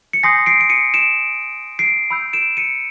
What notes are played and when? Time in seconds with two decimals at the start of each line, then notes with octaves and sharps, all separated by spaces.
0.13 C#7
0.23 G#5 C6 D#6 G6 A#6 C7
0.46 C7 D7
0.61 D7
0.70 C#7 D#7
0.94 D7 E7
1.79 C7 D7
2.10 B5 E6 G6
2.33 D7 E7
2.57 C#7 D#7